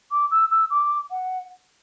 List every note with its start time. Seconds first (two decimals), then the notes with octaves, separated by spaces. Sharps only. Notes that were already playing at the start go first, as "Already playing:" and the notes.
0.11 D6
0.31 E6
0.51 E6
0.70 D6
1.10 F#5